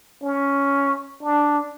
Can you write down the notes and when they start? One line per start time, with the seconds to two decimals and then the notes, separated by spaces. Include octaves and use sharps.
0.23 C#4
1.22 D4